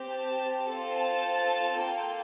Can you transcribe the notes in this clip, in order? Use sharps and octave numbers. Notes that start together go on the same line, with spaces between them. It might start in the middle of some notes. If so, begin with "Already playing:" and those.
Already playing: C4 G4
A5
C4 F4 A4
A5
A#3 F4 A4 G5